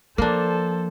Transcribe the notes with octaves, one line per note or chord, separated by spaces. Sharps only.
F3 A#3 D4 A4 C5